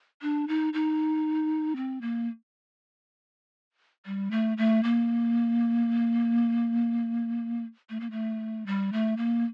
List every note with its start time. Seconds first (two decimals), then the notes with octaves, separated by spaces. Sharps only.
0.22 D4
0.48 D#4
0.73 D#4
1.76 C4
2.01 A#3
4.06 G3
4.31 A3
4.58 A3
4.83 A#3
7.90 A3
8.00 A#3
8.11 A3
8.66 G3
8.93 A3
9.17 A#3